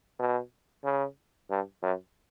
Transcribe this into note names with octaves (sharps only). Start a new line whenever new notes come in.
B2
C#3
G2
F#2